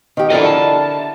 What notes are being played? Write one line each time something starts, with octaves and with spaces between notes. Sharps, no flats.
D#3 G4
D3 E4 F4 A4 A#4 D#5
A5